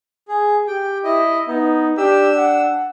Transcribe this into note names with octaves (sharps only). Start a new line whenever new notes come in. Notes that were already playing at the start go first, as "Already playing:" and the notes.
G#4
G4 G5
E4 D#5
B3 D#4
D4 G4 E6
F#5